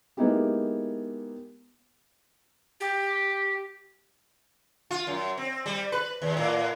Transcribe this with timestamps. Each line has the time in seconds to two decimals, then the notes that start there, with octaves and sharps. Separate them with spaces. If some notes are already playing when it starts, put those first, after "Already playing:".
0.17 G#3 A#3 B3 D#4 E4 G4
2.80 G4
4.91 F4
5.07 F#2
5.38 C4
5.66 G3
5.92 B4
6.22 D#2
6.37 A2